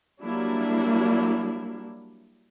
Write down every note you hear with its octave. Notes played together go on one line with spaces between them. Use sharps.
F#3 G3 A#3 D4 E4